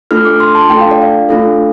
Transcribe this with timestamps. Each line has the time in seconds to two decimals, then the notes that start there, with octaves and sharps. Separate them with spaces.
0.11 A3 D4 F4 A4 F6
0.25 D6
0.40 C6
0.55 A5
0.70 A3 D4 F4 A4 G5
0.81 F5
0.91 D5
1.02 F5
1.29 A3 D4 F4 A4